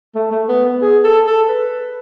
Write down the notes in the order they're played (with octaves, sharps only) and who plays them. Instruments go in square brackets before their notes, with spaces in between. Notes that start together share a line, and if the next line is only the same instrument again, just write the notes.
[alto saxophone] A3
A3
B3
B3
G#4
A4
A4
B4